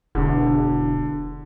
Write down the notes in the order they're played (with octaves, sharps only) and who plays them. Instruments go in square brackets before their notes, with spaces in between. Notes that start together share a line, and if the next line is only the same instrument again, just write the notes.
[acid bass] E1 [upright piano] D3